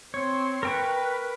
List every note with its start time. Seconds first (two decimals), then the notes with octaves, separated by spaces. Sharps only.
0.14 C4 C#5 C6
0.63 A#4 B4 G5 C#6